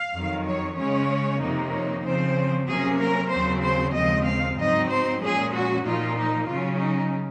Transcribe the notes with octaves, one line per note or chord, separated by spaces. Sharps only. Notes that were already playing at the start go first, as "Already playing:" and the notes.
Already playing: F5
F2 D#3 F#3
C#5
C#3 G#3 C#4 C#5
F2 C3 D#3 A#3 D#4
C#5
C#3 F3 C4 C5
C3 F#3 A#3 C#4 G#4
A#4
D#2 C#3 F#3 C4 C5
C5
D#2 C#3 F3 G#3 C4 D#5
F5
G#2 F#3 C4 D#4 D#5
C5
A#2 F3 G#3 C#4 G#4
F#4
A#2 F3 A#3 D#4 F4
D#4
C#3 F#3 C#4 F4
D#4